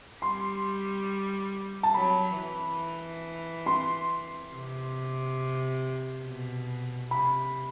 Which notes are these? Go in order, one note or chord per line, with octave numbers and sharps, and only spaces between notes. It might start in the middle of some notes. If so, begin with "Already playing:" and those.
G3 C6
A5
F#3 B5
E3
C6
C3
B2
C3 B5